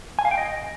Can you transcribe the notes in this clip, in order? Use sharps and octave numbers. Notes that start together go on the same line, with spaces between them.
G#5
F5
G5
D#5